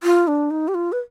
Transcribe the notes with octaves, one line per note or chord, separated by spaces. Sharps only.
F4
D4
D#4
G4
F4
B4